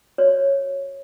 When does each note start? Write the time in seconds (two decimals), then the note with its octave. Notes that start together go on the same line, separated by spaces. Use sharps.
0.18 F#4 B4 C#5 D5